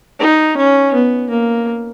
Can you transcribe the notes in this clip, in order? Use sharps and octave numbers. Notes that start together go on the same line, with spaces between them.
D#4
C#4
B3
A#3